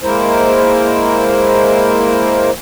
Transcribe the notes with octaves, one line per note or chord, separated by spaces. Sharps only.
G#3 A#3 E4 A#4 C5